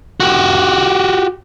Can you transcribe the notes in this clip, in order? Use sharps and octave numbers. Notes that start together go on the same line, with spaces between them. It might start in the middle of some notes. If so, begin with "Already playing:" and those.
F#4 G4